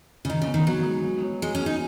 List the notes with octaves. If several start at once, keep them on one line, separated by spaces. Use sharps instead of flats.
C#3
D#3 D#4
C#3
B3
D#3
F#3 B3
G#3
B3
F#3
G#3 G#4
C#4
B3
D#4